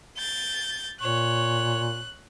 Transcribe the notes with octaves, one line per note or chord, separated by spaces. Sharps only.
G6 A6
A#2 C#5 F#6